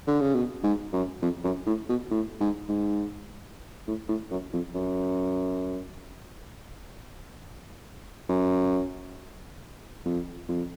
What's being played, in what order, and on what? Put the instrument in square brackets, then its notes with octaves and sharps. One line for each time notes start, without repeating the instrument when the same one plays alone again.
[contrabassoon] D3
C#3
B2
G#2
F#2
F2
F#2
A2
B2
A2
G#2
G#2
A2
A2
F#2
F2
F#2
F#2
F2
F2